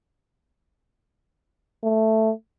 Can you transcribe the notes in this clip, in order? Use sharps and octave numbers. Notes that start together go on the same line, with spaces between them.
A3